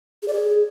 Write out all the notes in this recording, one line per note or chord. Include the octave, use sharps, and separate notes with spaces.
G#4
D5
G#4